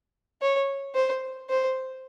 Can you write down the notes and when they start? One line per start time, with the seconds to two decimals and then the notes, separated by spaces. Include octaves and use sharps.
0.42 C#5
0.95 C5
1.50 C5